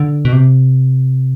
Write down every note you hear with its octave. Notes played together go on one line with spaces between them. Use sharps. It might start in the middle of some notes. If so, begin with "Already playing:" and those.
Already playing: D3
B2
C3